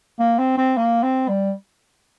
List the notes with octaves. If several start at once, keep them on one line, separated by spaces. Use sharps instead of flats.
A#3
C4
C4
A#3
C4
G3